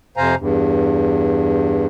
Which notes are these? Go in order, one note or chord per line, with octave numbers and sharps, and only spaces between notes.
F2 C3 C5 F5 G#5 A#5
E2 G2